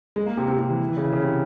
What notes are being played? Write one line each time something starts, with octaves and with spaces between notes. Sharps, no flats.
G#3
A#3
C3
C3
C3
E3
E3
C#3
E3
C#3
C3